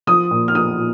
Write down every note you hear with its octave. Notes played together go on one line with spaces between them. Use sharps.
F3 D#6
A#2
F6
F3 D#6
A#2